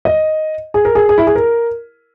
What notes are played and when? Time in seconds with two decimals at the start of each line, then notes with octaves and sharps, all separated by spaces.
0.05 D#5
0.74 G#4
0.85 A#4
0.95 G#4
1.09 G#4
1.18 E4
1.27 G#4
1.35 A#4